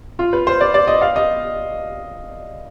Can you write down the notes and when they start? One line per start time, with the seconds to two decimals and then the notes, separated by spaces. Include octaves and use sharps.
0.19 F4
0.33 B4
0.47 C5
0.61 D5
0.74 D5
0.87 D#5
1.01 F5
1.16 D#5